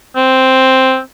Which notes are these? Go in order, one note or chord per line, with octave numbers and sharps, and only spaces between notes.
C4